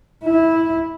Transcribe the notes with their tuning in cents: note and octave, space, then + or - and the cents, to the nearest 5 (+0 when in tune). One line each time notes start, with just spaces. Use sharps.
E4 -10